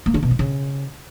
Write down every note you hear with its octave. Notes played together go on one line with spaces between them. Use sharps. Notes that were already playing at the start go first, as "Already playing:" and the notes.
A#3
D3
B2
E3
C#3